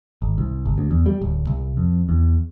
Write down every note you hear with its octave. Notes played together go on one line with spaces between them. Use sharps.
G#1
C2
G1
D2
E2
G3
D1
C2
F2
E2